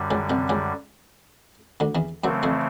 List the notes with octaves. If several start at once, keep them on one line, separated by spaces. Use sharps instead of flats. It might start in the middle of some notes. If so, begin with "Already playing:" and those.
Already playing: F#2 D3 G3
C#2 C#3
C2 C3
C#2 C#3
D2 D3
E2 E3
F#2 C#3 E3 F#3 A3 C4
F2 F3